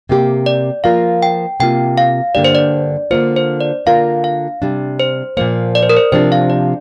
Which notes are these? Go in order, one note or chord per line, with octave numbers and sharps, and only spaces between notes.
C3 A#3 G4
D5
F3 A#3 F4 A#4 F5
G5
C3 A#3 F4 G5
F5
G2 D3 A#3 D4 G4 D5
C5
D5
D3 A#3 F4 C5
C5
D5
D3 A#3 F4 A#4 F5
F5
C3 G3 D4
C5
A#2 F3 A#3 C5
D5
C5
A#4
C5
C3 F3 D4 G4 C5
F5
D5